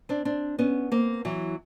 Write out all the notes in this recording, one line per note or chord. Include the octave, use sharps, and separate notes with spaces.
C4 D4
C4 D4
B3 C#4
A#3 C4
E3 F#3